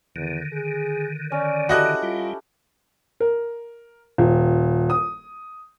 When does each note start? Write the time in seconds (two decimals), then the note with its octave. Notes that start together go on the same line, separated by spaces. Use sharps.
0.16 E2 D3 D#3
0.53 G#4
1.32 C#4 D5
1.69 E4 F#4 G4 A4 D#5 F#6
2.03 G3 F4
3.20 A#4
4.18 D#1
4.90 D#6